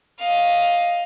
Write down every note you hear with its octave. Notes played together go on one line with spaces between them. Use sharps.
D#5 F5